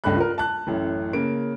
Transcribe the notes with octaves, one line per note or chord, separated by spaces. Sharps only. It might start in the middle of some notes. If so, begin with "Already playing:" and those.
C#2 G2 A3 B5 F#6
F4 A#4
A5 F#6
A1 F#2 A2
C#3 A#3 D7